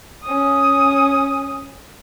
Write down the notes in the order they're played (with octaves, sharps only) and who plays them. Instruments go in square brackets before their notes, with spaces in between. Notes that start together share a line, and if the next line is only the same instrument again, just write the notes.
[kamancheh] C#4 D#6